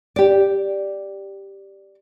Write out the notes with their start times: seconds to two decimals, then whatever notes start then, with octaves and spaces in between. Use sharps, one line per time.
0.16 G4 D5